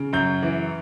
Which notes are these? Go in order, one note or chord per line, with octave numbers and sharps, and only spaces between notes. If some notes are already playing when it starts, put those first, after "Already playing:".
Already playing: C#3
F#2 G6
E3